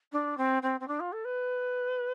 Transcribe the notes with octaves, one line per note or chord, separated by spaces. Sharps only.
D4
C4
C4
C4
D4
F4
A4
B4